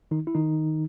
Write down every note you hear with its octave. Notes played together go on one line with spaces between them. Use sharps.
D#3 D#4
E4
D#3 D#4